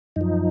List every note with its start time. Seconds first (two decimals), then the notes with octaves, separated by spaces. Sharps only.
0.16 F#2 F3 D#4